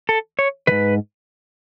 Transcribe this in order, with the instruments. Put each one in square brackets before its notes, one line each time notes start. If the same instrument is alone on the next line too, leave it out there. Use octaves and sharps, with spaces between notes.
[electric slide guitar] A4
C#5
D#3 B4
G#2